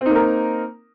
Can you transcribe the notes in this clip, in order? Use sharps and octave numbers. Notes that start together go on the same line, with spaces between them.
A#3 C4 D#4 A#4